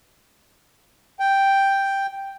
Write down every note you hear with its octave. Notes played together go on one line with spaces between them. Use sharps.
G5